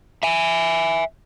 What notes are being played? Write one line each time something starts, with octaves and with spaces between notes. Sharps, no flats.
E5 G#5